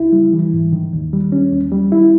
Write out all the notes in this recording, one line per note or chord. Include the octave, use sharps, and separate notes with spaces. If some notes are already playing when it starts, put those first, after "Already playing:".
Already playing: C#2 E4
G3
E3
G#2
D#3
D#2
G3
C#4
D#2
G3
E4